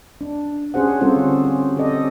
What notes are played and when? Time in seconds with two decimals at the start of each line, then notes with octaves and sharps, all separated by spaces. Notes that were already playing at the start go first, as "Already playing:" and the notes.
0.21 D4
0.74 C#4 G4 G#4 C5 F#5
1.01 G3 C4 C#4 F4 A4 C5
1.16 D3
1.45 G4
1.77 C4 G4 A4 D5 D#5